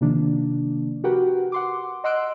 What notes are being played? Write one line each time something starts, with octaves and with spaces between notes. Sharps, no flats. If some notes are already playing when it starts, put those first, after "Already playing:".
C3 D#3 F3 A#3 D4
F#4 G4 A#4 B4 F#5 G5
F#5 C6 D6
D#5 F#5 C6 E6 F#6 D7